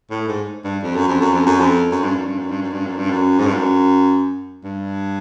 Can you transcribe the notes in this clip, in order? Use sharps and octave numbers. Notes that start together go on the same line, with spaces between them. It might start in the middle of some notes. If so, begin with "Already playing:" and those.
A2
G#2
G2
F2
F#2
F2
F#2
F2
F#2
F2
F#2
G2
F#2
G2
F#2
G2
F#2
G2
F#2
G2
F#2
G#2
G2
F#2
G2